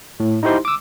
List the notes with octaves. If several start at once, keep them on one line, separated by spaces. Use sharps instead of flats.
A2
D#4 E4 G4 C5 C6
D6 E6